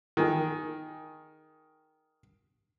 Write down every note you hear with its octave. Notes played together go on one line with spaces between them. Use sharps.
D#3 G#4